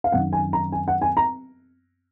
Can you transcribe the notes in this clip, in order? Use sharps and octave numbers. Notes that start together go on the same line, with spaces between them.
F5
F#2 D#3 F#5
G#5
A#5
G#5
F#5
G#5
A#5